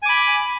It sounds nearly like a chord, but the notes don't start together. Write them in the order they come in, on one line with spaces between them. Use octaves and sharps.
G#5 D6 B5